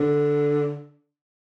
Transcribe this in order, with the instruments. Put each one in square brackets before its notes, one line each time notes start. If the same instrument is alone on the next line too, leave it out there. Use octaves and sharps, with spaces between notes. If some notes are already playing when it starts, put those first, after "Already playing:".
Already playing: [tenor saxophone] D3